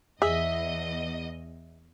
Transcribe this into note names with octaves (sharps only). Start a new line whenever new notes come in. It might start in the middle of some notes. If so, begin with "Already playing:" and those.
E2 G#4 D#5 E5